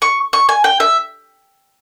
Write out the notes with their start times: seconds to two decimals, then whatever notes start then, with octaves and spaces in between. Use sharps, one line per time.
0.02 C#6
0.33 C#6
0.49 G#5
0.64 G5
0.80 E5